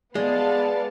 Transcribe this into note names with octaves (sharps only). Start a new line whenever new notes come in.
G#3 B3 D5 F5 A5